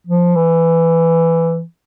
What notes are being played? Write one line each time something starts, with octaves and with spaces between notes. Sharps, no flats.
F3
E3